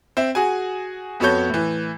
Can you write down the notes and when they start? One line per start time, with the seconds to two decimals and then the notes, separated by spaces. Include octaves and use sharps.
0.17 C4 E5
0.35 F#4 G#4 G#5
1.20 F2 B3 F#4 A4 C#5 G6
1.50 A2 E3